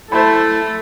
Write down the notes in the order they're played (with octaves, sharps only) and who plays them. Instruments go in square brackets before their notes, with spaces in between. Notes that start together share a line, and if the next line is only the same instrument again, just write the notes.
[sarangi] A3 [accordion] E4 [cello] A4 [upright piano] C5 A5 B5